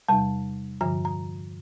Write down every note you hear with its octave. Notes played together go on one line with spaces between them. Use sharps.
E2 C3 G3 A5
G2 D3 F3 A#5
A#5